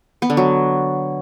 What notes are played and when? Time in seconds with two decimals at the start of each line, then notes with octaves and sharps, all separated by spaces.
0.22 B3
0.30 D3
0.37 F#3